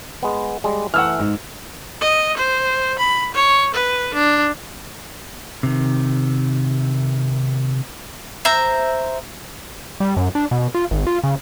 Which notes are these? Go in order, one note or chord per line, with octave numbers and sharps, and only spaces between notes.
G#3 B3
G3 G#3
E3 A3 F#5 E6 F6
G#2
D#5
C5
B5
C#5
B4
D4
C3 D#3
C5 E5 A#5
G3
F#2
D4
B2
F4
G#1
F4
C#3